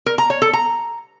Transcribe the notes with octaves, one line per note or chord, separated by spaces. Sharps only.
A#4
A#5
C#5
A4
A#5